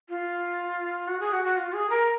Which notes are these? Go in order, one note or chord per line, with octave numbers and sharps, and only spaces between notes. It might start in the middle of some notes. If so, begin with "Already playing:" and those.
F4
F#4
G#4
F#4
F#4
F4
G#4
A#4